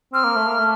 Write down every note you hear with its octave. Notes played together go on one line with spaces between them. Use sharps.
C4 F6
A#3
A3
A#3
A3